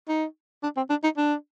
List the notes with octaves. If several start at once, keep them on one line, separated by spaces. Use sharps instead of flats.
D#4
D4
C4
D4
D#4
D4